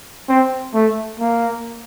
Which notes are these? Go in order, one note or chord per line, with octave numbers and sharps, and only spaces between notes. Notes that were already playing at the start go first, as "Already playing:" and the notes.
C4
A3
A#3